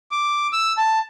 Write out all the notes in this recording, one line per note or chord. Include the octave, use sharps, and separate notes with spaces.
D6
E6
A5